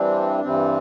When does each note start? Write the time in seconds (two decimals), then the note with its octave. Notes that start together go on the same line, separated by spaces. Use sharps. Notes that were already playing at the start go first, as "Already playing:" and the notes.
Already playing: G2 E3 G3 C4 D4
0.43 G2 E3 G3 C4